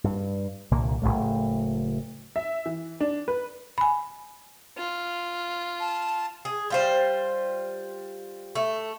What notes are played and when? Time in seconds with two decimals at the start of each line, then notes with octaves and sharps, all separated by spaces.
0.04 G2
0.71 C2 A#2 D3 A#3
1.02 F#1 F2 A2 A3
2.36 E5
2.66 E3
3.01 D4
3.28 B4
3.78 G#5 B5
4.78 F4
5.80 A5
6.45 G#4
6.70 G3 F4 C5
8.55 A3